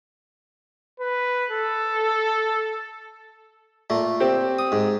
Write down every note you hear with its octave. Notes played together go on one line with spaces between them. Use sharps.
B4
A4
A#2 A3
C4 G4
D#6
G#2